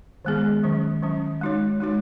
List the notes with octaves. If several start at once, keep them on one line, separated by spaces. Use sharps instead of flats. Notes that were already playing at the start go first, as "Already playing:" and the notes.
D#3 G#3 B3 G#4
D#3 F#3 C#4
D#3 F#3 C#4
G#3 D#4 F#4 C#5
G#3 D#4 F#4 C#5